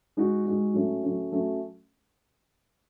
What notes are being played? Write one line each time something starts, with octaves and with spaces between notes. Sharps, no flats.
G#3 D#4 F#4
G#3 D#4 F#4
F#3 A3 C#4
F#3 A3 C#4
F#3 A3 C#4